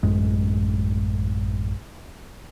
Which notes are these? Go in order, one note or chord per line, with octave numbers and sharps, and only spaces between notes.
A1 F#2 G#3